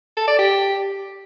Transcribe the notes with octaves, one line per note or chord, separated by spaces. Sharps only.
A4
D5
G4